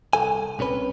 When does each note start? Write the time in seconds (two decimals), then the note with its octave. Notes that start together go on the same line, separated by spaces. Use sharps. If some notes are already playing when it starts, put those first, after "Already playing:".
0.13 C2 C3 A4 G#5
0.59 C2 C3 C#4 B4